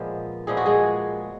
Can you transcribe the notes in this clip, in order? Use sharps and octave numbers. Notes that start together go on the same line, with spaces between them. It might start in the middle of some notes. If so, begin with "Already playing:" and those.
Already playing: A#2 F3 G#3 B3
A#2 F3 G#3 B3 G#4
F#4
G#3 G#4